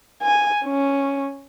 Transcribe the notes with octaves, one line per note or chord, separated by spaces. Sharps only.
G#5
C#4